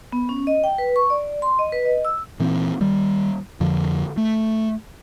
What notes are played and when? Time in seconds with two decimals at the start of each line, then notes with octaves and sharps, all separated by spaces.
0.12 B3
0.29 C#4
0.47 D#5
0.64 G5
0.78 B4
0.96 C#6
1.10 D5
1.42 C6
1.59 D#5
1.72 B4
1.85 D#5
2.05 E6
2.40 A#2 E3 C4
2.80 D#3 G3
3.60 F2 D3 F3
4.17 A3